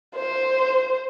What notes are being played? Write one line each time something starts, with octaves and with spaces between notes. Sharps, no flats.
C5